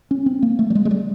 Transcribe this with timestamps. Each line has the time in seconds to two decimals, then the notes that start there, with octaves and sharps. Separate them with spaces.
0.11 C#4
0.26 C4
0.43 A#3
0.59 A3
0.70 G3
0.75 G#3
0.85 G#3
0.91 G3